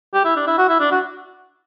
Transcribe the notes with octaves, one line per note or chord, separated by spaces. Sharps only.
G4
E4
D4
E4
F#4
E4
D4
F#4